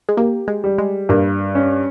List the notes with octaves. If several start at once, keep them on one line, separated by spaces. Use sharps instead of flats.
G#3
A#3 G4
G#3
G3
G#3
G2 A#3
C#4